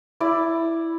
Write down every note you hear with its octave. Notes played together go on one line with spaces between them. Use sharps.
E4 D5